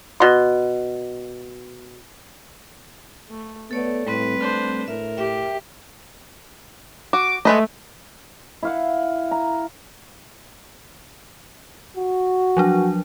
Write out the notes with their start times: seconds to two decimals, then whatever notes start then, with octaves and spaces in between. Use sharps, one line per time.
0.20 B2 C6
3.29 A3
3.71 A3 B3 A4 C#5 D5
4.06 A2 G3 C4 B4
4.39 A3 D4 C5
4.88 A2 A#4 E5
5.17 G4 E5 G5
7.13 F#4 D6
7.45 G#3 A3 B4 D#5
8.63 E4 F5 F#5
9.31 A#5
11.97 F#4
12.57 F3 F#3 D4